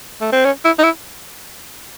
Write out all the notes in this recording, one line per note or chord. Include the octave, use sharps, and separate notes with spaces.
A3
C4
C#4
E4
D#4
E4